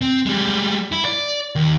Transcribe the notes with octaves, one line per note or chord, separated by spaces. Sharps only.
C4
G3 G#3
E4
D5
D#2